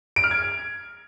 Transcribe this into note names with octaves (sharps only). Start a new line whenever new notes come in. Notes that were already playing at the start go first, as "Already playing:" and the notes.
D7
F6
G#6